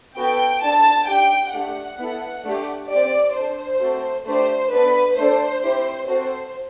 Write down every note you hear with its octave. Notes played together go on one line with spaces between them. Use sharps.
B3 F#4 A4 G5
D4 A4 A5
D4 G4 G5
A3 D4 G4 F#5
B3 E4 A4
A3 D4 G4
C4 G4 D5
D4 A4 C5
A3 C4 F#4 A4
A3 D4 G4 C5
B3 D4 A4 B4
A3 D4 A4 C5
C4 E4 G4
C4 F#4 A4 C5